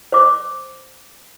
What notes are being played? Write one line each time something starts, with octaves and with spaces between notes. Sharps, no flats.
C5 D6